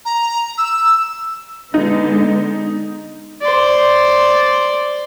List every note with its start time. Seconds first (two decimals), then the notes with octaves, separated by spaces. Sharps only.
0.05 A#5
0.58 E6
1.74 D3 G#3 B3 D#4
3.42 C5 D5